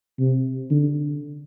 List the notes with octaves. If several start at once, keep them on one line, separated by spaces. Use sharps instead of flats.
C3
D3